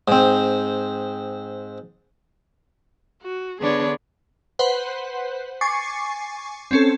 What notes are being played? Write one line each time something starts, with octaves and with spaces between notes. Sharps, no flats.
G#2 C4
F#4
D3 B3 D4 G#4 B4 C#5
B4 C5 F#5
G#5 C#6 D6 A6 C7 C#7
C4 C#4 A4